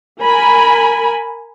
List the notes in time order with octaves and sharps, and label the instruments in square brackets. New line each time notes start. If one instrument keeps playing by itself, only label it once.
[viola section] A#4 G#5 B5